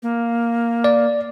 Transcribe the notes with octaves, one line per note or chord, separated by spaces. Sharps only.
A#3
D5